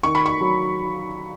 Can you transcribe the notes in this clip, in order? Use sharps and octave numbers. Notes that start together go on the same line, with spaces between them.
D#3 C#6
B5
C#6
F#3